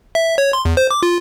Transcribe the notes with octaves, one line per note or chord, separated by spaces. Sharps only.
E5
C#5
C6
E2
C5
D6
F4